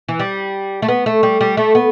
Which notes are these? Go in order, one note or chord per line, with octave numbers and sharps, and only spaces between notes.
E3
G3
A3
B3
A3
G3
G3
A3
B3